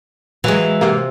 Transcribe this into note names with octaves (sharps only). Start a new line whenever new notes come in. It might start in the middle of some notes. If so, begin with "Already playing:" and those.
E3 F#3 G#3 A#3
C3 A#3